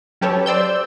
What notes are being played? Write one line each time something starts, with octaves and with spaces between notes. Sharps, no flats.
F#3 C#4 G4 A4 B4 C#5
C5 D5 E6 G6